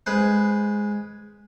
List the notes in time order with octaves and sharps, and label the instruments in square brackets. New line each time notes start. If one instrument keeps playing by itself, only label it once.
[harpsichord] G#3 B4 C5